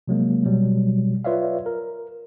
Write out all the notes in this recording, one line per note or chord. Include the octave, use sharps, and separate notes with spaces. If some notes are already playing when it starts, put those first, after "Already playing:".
C3 F#3 G#3 A#3
B2 F#3 G3
F4 B4 C#5 D5 E5 F5
A#4